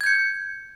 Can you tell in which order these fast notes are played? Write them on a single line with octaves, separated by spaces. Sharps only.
G#6 G6 C#7